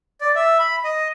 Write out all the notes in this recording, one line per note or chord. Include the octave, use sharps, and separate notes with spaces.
D5
E5
B5
D#5